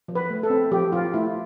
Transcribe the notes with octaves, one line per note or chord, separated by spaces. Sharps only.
F3
B4
A3
A4
C4
F3 G4
F3 F4
A3 E4